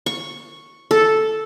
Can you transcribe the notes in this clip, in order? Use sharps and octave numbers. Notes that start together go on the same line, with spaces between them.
C#6
A4